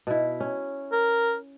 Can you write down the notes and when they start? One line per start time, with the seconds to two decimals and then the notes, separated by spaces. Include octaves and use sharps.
0.07 B2 E4
0.40 C#4
0.93 A#4